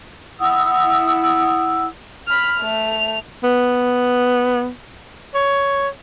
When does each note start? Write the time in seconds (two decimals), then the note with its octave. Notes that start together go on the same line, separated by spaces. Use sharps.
0.40 E4 F#5 D#6 E6
2.27 B5 F6
2.61 A3 F7
3.44 B3
5.35 C#5